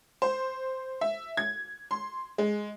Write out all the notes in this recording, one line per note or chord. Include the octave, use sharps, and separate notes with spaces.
C5
E5
G#6
C6
G#3